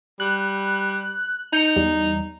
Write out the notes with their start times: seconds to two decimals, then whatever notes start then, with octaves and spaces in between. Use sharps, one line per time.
0.20 G3 F#6
1.53 D#4 G6 C#7
1.76 E2 G3